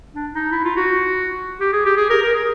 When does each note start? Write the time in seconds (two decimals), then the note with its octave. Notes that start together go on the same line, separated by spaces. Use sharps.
0.15 D4
0.34 D#4
0.52 E4
0.64 F4
0.76 F#4
1.60 G4
1.73 G#4
1.86 G4
1.97 G#4
2.10 A#4
2.22 A#4
2.34 G#4